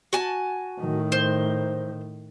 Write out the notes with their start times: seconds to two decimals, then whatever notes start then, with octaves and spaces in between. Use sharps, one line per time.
0.13 F#4 G#5 A5
0.80 A2 D#3
1.12 C5